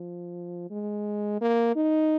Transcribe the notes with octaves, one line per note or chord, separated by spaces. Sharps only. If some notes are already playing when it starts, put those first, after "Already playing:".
Already playing: F3
G#3
A#3
D#4